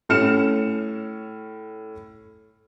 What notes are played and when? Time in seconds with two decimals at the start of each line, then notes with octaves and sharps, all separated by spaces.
0.09 A2 C#4 F6 C#7 E7